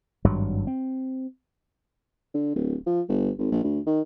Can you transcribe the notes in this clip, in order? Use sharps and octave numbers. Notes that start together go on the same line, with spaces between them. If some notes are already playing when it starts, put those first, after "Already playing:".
G#1 G2 F#3
C4
D3
D1
F3
G1
G#1
A#1
D2
D#3